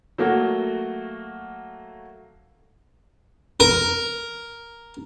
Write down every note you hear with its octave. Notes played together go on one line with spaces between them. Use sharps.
F#3 A3 A#3 F#4
A#4